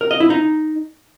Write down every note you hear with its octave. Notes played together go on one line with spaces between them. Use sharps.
A#4
D#5
E4
D#4